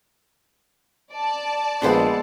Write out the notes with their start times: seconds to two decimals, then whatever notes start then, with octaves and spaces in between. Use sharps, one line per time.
1.13 D5 A5
1.82 A#1 G#3 B3 A4 C5